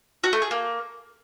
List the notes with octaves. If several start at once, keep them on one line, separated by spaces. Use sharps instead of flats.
F#4
A3
G#4
A#3